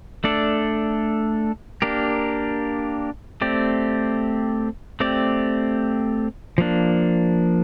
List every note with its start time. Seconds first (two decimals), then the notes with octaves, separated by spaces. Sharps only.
0.24 A3 D4 A4 D5
1.82 A#3 D4 G4 A#4
3.41 A3 C4 G4 D5
5.00 A3 C4 G4 D5
6.58 F3 A#3 D4